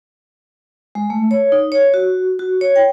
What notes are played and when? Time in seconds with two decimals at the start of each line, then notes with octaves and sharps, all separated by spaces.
0.95 G#3
1.10 A3
1.31 C#5
1.52 D#4
1.72 C#5
1.94 F#4
2.39 F#4
2.61 C#5
2.76 G5